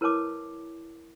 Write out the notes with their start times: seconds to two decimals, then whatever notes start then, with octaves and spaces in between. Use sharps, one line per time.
0.01 E4 A#4 B4 C#5 A5 D6